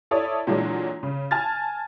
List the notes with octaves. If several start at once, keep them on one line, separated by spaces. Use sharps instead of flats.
E4 A4 C#5 D5 D#6
A#2 D3 E3 F#3 G#3 D4
C#3
G#5 A5 F6 G#6 A6